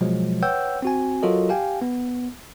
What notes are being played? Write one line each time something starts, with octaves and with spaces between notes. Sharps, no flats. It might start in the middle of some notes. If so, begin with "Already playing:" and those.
B2 F3 F#3 G#3
B4 C#5 F#5 G5 E6 G6
C4 F#4 G#5
F#3 F4 F#4 A4 A#4 D#5
G4 F5 G5 G#5
B3